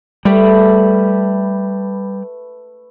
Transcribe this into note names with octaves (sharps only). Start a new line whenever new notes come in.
G3 A3 B4